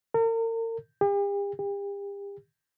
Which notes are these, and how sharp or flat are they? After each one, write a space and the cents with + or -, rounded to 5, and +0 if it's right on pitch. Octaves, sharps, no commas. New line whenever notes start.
A#4 -40
G4 +45
G4 +40